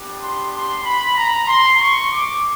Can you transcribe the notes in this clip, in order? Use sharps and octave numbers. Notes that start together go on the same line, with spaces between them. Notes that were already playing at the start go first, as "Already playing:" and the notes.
Already playing: B3 D4 G4
C6
C6
B5
A#5
C6
C#6
D6